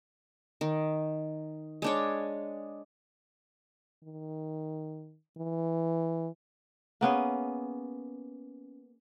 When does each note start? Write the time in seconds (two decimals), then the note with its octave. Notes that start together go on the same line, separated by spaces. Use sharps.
0.61 D#3
1.82 G#3 D4 C#5
4.03 D#3
5.37 E3
7.01 A#3 B3 C#4 G#4